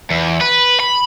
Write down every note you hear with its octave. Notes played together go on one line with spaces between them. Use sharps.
E2
B4
B5